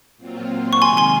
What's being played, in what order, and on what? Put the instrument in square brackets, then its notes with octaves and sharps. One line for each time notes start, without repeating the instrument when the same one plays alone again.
[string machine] A#2 F#3 C4 F4
[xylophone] C#6
[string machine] C3 D#3 G#3 C4 F4 [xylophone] G#5 C6
[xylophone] G#5 C6